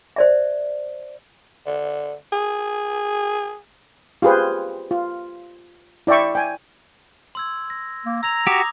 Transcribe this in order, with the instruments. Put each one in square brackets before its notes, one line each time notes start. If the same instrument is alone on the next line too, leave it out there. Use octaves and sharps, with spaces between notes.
[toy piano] C5 D5 E5
[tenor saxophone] D3
G#4
[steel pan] F4 G4 G#4 B4 C5
F4
E4 D5 E5 G5 C#6
G5 G#5
[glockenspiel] C6 E6 G#6
A#6
[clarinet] A#3
[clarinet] A#5 [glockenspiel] E6 G#6 F7
[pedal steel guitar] F#4 G4 [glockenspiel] D6 D#6